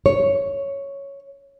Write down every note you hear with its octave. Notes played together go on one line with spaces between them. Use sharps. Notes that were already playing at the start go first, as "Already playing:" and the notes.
C#5